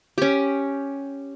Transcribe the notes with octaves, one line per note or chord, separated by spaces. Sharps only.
C#4 G4